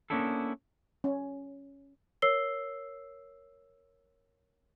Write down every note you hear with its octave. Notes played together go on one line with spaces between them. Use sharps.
A#3 B3 C#4 D4 E4 A4
C#4
A#4 C#5 E6 C7 G7